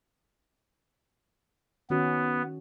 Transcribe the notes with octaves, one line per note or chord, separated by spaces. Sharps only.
D#3 B3 C#4 F#4